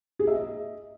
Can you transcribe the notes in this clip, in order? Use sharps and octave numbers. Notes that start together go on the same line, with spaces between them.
G#4
E5
D#5